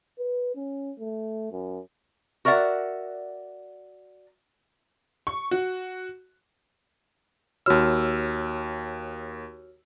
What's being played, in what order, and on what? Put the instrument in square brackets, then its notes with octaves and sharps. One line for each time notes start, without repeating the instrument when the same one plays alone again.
[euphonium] B4
C#4
A3
F#2
[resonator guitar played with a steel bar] F#4 A#4 D5 E5 F#5
[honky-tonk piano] C#6
F#4
[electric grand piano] D#2 E6 [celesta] F#4 C#5 F6